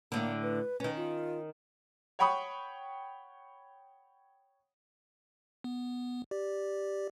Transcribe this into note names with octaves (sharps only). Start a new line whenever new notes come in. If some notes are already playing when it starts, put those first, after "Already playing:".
A2 D3 A#3
B4
D#3 C#4 B4
F4
C#5 F#5 G5 B5 C#6 D#6
B3
G4 D5